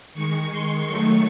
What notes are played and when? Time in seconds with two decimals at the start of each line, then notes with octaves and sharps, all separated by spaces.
0.13 D#3 G#3 C#6
0.50 C6
0.86 D#3 F#3 A3 C#6